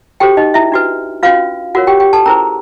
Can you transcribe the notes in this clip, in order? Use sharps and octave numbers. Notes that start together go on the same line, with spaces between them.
F#4 G4 A4 C5 G5
D#4 D#5
E4 E5
D4 F#4 B4
C#4 F4 F#4 B4 F5
F4 F#4 A#4 C#5 F#5
G4 G5
G4 G5
A4 A5
C#4 E4 G#4 A#4 C5 A#5